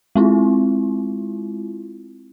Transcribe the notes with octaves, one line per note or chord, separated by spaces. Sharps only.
G#3 C4 E4 F4